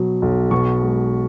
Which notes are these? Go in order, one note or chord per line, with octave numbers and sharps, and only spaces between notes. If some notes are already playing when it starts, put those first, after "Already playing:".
Already playing: B2 F#3
B1
B2 C#6
G#3